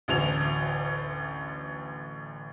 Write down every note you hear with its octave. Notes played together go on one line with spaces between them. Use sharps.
A1 D2 F7